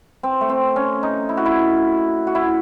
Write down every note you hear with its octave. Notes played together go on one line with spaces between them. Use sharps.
C4
A3
C4
C#4
D#4
E4
F#4
E4
F#4
E4